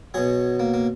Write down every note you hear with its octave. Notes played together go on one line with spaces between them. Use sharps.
B2 F#3 G#4
A#3
A#3